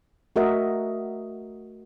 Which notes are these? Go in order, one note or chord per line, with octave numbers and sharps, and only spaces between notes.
A3 F#4 A#4 D#5 E5